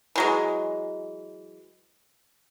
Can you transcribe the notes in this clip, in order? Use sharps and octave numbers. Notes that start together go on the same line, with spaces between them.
E3 F#3 G#3